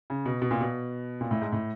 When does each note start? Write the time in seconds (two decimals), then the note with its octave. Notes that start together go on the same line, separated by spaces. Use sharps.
0.10 C#3
0.25 B2
0.42 B2
0.51 A#2
0.61 B2
1.21 A#2
1.31 A2
1.41 G#2
1.52 A2